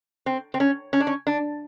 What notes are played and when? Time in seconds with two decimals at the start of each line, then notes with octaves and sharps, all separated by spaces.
0.26 C4
0.54 C4
0.60 C#4
0.93 C#4
1.00 D4
1.07 C#4
1.27 D4